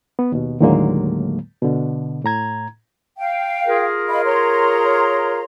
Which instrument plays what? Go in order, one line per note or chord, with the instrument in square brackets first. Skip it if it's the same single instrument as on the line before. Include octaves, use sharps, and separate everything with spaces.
[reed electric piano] B3
D#2 B2
D#2 A2 D3 F#3 G#3 A#3
B2 D3
A2 A#5 G#6
[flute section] F5 G5
[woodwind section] F4 G#4 A#4
[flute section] D#5 F5 B5
C#5 A#5 C6